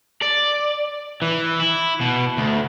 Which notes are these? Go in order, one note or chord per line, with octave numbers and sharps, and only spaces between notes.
D5
E3
E4
B2
D2